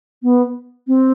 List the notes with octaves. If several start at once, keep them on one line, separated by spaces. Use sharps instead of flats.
B3
C4